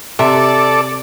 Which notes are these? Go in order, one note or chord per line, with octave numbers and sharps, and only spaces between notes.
C3 A4 D5 E5